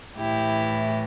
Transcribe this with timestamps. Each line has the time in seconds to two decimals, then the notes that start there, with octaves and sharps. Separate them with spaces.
0.17 A2 E3 E4 G4